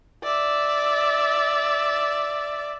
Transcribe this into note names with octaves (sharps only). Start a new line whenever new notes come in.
D5 E5